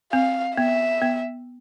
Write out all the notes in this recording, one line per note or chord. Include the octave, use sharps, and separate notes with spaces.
C4 F5
B3 E5
B3